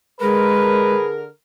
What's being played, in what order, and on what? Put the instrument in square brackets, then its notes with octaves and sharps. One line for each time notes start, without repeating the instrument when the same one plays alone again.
[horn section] D3 A#4 [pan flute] G#3 [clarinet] G#4 [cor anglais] B4